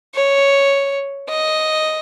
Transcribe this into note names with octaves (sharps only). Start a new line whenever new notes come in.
C#5
D#5